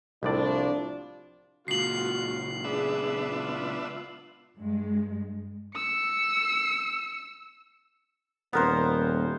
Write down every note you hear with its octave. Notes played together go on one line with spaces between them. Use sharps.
C2 A2 F3 D4 D5
C#2 A#2 F4 F#4 C7 F#7
B3 D4 F4 G#4 E5
F4
G2 G#3
E6 C#7
D#1 B3 A#4 C5